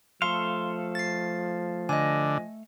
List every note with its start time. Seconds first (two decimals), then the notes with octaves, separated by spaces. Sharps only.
0.22 F3 A3 A4 F5 C6
0.95 A6 C7
1.89 D3 D#5 G#5